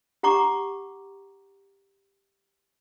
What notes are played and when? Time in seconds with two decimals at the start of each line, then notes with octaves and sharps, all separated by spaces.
0.23 G4 F#5 A#5 C#6 D6